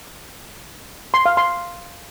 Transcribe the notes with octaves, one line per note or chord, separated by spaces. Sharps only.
C6
F5
C6